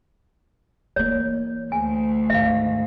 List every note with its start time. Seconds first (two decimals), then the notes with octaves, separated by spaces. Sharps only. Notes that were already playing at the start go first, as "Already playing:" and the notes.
0.96 E3 A#3 C#5
1.72 D2 G#5
2.30 G#2 D#3 E5 F5